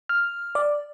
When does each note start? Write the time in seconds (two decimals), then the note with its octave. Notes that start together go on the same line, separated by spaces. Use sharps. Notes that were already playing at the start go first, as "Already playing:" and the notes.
0.09 F6
0.55 D5